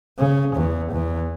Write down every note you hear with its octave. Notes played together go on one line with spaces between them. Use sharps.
C#3
E2
E2